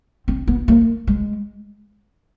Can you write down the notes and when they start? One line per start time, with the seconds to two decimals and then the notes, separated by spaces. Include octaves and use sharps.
0.28 C4
0.47 B3
0.68 A#3
1.07 G#3